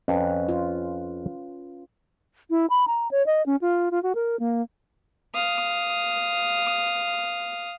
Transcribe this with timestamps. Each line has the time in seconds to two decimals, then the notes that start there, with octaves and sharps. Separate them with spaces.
0.08 F2 C#4 B4
0.49 F4
2.50 E4
2.70 B5
2.88 A#5
3.11 C#5
3.26 D#5
3.46 C#4
3.61 F4
3.91 F4
4.03 F#4
4.15 A#4
4.40 A#3
5.35 F5 D#6